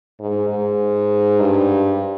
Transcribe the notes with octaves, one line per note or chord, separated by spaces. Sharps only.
G#2
G#2
G2